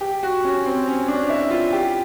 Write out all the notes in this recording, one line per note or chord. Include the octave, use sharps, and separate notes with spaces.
G4
F#4
C#4
C4
C#4
D4
E4
F4
G4